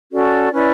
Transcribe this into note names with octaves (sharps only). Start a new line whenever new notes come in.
C#4 F#4 A4 D5
C#4 E4 B4 D5